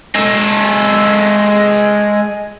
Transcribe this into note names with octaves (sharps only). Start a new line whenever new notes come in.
G#3 A4